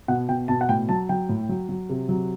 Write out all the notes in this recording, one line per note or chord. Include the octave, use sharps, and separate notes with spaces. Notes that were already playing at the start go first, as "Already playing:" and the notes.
B2 F#5
B2 G5
B2 A5
F#5
A2 G5
F#3 A5
F#3 G5
A2
F#3
F#3
C3
F#3